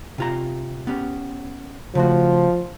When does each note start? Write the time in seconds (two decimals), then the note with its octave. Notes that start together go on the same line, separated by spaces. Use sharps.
0.18 C3 F4 A#5
0.87 B3 C#4 G4
1.95 C#3 F3 A3 F#4